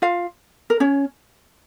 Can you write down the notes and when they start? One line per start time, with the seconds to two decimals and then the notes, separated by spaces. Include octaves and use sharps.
0.02 F4 F5
0.70 A#4
0.80 C#4 C#5